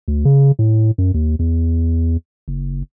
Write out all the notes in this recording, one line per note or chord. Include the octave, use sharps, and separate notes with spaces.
D2
C#3
A2
F#2
D#2
E2
F#1